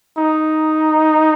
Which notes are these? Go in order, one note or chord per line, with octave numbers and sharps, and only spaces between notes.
D#4